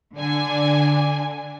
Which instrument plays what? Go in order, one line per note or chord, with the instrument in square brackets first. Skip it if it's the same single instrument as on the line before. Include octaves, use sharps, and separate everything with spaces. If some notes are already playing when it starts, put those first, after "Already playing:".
[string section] D3 D4 G#5